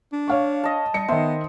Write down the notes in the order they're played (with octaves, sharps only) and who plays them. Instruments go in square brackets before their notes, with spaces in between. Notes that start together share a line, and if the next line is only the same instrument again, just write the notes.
[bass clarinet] D4
[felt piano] C#5 F5 C#6
[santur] D#5 A5
[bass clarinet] G3 [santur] D#5 [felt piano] C#7
[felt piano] D#3 E5 [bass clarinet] B3 [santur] C5 C6